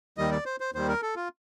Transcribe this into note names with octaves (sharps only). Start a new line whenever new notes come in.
D#2 D#3 G3 D#5
D5
C5
C5
D#2 D#3 G3 C5
A#4
A4
F4